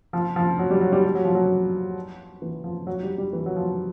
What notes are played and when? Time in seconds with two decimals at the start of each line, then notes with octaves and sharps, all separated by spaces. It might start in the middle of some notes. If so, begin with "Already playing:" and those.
0.13 F3
0.36 F3
0.59 F#3
0.71 G3
0.81 F#3
0.92 G3
1.04 G3
1.15 F#3
1.25 F3
1.35 F#3
2.42 E3
2.64 F3
2.87 F#3
3.03 G3
3.18 G3
3.33 E3
3.46 F#3
3.56 F3